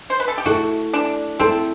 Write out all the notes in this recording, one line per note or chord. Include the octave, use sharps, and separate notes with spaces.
C5
B4
A4
G4
A3 E4 F#4 A4
D4
A3 C4 E4 A4